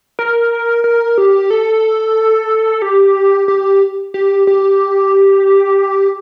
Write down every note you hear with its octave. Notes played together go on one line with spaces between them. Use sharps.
A#4
A#4
G4
A4
G4
G4
G4
G4